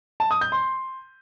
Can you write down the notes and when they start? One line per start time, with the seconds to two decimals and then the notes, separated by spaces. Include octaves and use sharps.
0.20 A5
0.31 D#6
0.41 G6
0.52 C6